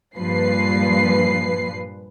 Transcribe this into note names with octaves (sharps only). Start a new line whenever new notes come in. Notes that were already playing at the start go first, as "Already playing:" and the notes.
G2 A#2 F3 B4 C7